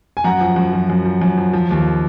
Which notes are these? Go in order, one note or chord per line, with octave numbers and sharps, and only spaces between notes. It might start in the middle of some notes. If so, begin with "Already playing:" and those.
G#5
F#2 F#5 A#5
F3
F#2
F3
F#2
F3
F#2
F3
F3
D#2